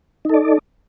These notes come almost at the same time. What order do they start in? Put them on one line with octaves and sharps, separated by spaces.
D#4 A4 D5